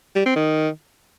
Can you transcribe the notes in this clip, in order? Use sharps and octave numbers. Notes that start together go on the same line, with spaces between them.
G3
C4
D#3